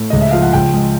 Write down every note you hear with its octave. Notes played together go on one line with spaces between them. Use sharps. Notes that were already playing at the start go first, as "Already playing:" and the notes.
Already playing: A2
C#2 D#5
E5
F3 F5
F#5
C#2 G5
G#3